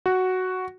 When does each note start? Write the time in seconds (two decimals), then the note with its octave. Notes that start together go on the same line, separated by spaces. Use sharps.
0.06 F#4